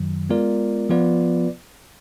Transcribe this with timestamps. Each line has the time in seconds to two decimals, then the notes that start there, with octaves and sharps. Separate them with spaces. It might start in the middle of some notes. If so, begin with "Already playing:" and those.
Already playing: F#2 D#3 F#3
0.29 G#3 B3 F4 A#4 D5
0.89 F3 B3 F4 B4 D5